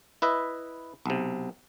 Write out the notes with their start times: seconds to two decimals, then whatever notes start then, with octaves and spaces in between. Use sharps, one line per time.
0.22 E4 B4 D#5 E5
1.06 B1 C3